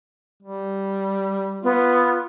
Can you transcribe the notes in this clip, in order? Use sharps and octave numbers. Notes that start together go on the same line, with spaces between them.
G3
B3 F4